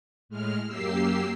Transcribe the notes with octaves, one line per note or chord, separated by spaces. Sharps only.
A2 G#3 F6
F#2 A#3 G4 E6 C7